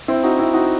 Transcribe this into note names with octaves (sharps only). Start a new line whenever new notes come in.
C4 E4
D#4 F#4
C4 E4
D#4 F#4